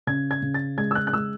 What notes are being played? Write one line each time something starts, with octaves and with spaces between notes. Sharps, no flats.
C#3 G#6
G#6
C#3
A6
G#3 G#6
E6
F#6
F#6
G#3 E6